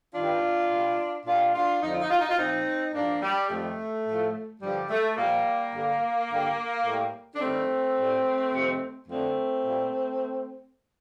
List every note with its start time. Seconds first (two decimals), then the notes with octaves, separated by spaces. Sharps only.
0.15 G2 D#3 G3 D4 F4
0.71 A#2 G3
1.26 A#2 G3 D4 F4
1.54 D4 F4
1.83 F2 D3 F3 D#4
1.92 F4
2.01 D#4
2.11 F4
2.20 D#4
2.29 F4
2.39 A#2 F3 C4 D#4
2.95 G2 F3 A#3 D4
3.22 G3
3.50 F2 D#3 G3 A3
4.07 A2 F3
4.61 G2 D3 F3 G3
4.90 A3
5.17 A#2 F3 G3 A#3
5.73 G2 D3 G3
6.29 G2 D3 G3
6.86 A2 G3
7.35 D4
7.41 G2 D#3 G3 A3 C4
7.97 A2 G3
8.53 F2 C3 D#3
9.08 F2 D3 F3 A3 C4
9.65 A#2 G3